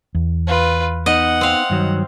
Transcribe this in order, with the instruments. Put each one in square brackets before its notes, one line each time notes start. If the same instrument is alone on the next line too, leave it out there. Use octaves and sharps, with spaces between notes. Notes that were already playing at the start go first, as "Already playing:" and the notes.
[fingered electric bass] E2
[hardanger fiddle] F4 B4
[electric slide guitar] B3 D#4 [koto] D#5 [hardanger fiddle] F#5
[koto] C4 F5
[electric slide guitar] G2 D#3 F#3